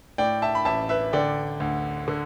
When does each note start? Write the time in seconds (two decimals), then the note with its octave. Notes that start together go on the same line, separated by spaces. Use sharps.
0.18 A2 D5 G5
0.42 E5 A5
0.55 B5
0.65 A1 E5 A5
0.89 B4 E5
1.13 D3 D5 G5
1.60 D2
2.08 D3